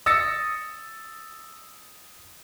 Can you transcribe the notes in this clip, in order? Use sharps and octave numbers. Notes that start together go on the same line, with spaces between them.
D#6 E6 A6 A#6 C#7